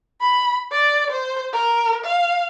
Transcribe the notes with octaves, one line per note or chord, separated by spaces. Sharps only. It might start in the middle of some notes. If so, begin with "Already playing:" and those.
B5
D5
C5
A#4
F5